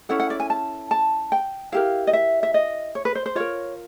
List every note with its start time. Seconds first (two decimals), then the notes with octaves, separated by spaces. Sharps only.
0.09 C#4 E4 A4 F#5
0.20 F#5
0.30 D5
0.40 G#5
0.50 A5
0.91 A5
1.32 G5
1.72 E4 G4 A#4 F5
2.07 D#5
2.13 E5
2.43 E5
2.54 D#5
2.95 C#5
3.05 B4
3.15 C5
3.26 C5
3.35 F4 A#4 C#5